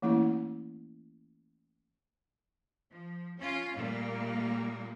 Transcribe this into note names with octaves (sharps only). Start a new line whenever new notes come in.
E3 A3 A#3 C#4 E4
F3
C#4 F4
A#2 G3 A3 A#3